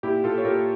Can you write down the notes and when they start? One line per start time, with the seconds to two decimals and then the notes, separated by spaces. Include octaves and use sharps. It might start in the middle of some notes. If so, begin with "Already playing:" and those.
0.03 A#2 E4 G4
0.24 A#2 F4 A4
0.38 C#5
0.45 A#2 G4 A#4